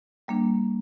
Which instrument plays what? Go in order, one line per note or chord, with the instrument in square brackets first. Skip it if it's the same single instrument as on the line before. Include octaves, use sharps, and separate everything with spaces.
[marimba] G3 A#3 D4